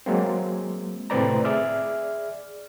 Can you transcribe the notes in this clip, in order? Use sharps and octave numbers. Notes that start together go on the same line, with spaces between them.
F#3 G#3 A#3 C4
A2 C3 C4 B4 D5 A#5
G#4 D5 E5 F6